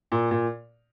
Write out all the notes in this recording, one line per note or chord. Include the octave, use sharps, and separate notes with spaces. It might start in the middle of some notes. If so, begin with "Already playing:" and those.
A#2
A#2